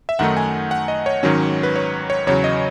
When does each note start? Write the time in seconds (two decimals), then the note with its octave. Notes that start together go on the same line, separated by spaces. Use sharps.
0.09 E5
0.19 F#2 D#3 A3 D#4 F#5
0.37 G#5
0.71 F#5
0.88 D#5
1.06 C#5
1.23 G#2 D#3 F#3 C#4
1.63 B4
1.76 C#5
2.10 C#5
2.27 E2 C#3 F#3 C#5
2.44 D#5